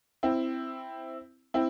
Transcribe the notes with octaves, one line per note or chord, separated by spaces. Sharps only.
C4 E4
C4 E4